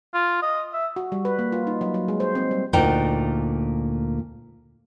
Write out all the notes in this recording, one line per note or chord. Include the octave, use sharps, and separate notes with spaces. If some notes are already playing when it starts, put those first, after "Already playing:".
F4
D#5
E5
F#4
G3
B4
A#3
F4
D#4
F#3
F#3
G#3
C5
C4
G3
D2 A#2 D4 D#4 A#4 G5